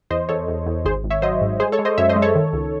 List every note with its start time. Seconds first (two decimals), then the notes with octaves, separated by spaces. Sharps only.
0.10 E2 C5 D#5
0.29 E2 A4 C#5
0.48 E2
0.66 E2
0.85 G#1 G#4 C5
1.04 G#1
1.10 C#5 E5
1.22 F#3 C5 D#5
1.41 G#2
1.60 G#3 G#4 C5
1.72 A4 C#5
1.79 G#3
1.85 C5 D#5
1.98 F#2 C#5 E5
2.09 C5 D#5
2.16 G#3
2.22 A4 C#5
2.36 D#3
2.53 C#2